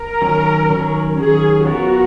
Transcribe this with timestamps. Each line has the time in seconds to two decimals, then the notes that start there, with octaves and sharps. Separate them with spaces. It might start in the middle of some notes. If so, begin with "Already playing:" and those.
Already playing: A#4
0.22 D#3 F#3 C#4
0.70 D#3 F#3 C#4
1.18 D#3 F#3 C#4 G#4
1.66 F#3 B3 F4 F#4 A#4 C#5